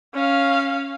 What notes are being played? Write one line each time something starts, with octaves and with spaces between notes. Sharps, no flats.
C#4 F5